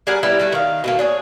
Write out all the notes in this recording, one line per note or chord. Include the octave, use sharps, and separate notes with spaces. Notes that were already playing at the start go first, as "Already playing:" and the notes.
G3 G#4 A#4 F#5
G3 B3 E4 G4
G3 A3 F#4
D#3 F5
B2 A3 A#3
D4 G#4 C#5